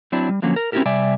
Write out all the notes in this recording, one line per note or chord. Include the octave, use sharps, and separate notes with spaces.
F#3 C4 D4 E4 D5
G3
D3 F3 F#3 A#3 C#4
A#4
C4 C#4 E4 F#4 G4 A#4
C3 G3 D5 E5 G#5